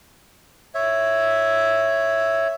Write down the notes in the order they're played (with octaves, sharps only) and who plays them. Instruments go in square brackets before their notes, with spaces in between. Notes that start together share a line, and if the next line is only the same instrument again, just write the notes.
[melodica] C#5 E5